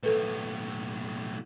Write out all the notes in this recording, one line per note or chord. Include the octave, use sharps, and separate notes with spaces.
B1 A2 A4 B4